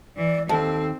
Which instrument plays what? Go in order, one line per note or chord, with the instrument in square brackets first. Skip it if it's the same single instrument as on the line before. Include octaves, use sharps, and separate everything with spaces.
[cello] E3 [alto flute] D5
[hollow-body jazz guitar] D#2 [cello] C4 [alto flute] A4 [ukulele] A5